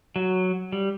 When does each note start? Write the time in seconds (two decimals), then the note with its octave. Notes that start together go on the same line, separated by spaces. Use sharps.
0.16 F#3
0.72 G3